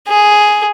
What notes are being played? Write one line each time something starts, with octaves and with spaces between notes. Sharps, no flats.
G#4